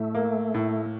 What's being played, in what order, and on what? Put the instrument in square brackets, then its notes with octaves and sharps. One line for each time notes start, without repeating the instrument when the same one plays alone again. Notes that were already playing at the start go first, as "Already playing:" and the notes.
Already playing: [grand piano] A2 [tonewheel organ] A3
[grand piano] A#3
A2